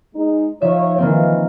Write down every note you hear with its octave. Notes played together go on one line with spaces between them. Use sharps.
G#3 D#4
F3 D#4 C#5 E5
D#3 E3 A#3 C4